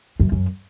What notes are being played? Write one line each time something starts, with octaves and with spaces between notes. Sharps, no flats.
F#2
F#2